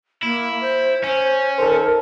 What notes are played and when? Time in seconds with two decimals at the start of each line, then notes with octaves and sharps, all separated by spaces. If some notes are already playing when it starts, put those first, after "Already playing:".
0.23 A#3 E4
0.61 C5
1.04 C#4 C5
1.58 D#3 A4 A#4 C5